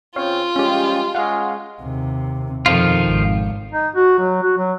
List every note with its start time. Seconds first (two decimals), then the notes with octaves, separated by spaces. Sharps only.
0.16 C#3 C4 F4 C#5 F5
0.56 F3 G3 G#3 C#4 G4
1.15 G#3 C#4 F5 F#5
1.82 D#2 C3
2.66 F2 B2 D#3 F3 F4
3.08 G#1
3.72 D#4
3.95 F#4
4.19 F#3
4.42 F#4
4.57 F#3